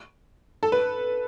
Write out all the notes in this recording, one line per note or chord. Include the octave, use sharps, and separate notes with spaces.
A4
B4